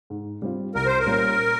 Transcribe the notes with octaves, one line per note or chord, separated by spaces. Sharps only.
G#2
G3 C4 F4
C2 A#4
C5
A#4
A#2 G3 A#3 C#4